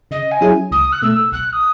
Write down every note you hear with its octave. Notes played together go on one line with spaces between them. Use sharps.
C#3 D#5
G#5
F#3 C#4 E4 G#4
C#2 D#6
F#6
B2 A3 E6
B1 F#6
D#6